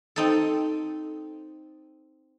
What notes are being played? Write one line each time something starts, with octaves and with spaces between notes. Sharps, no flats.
C4 D#4 A4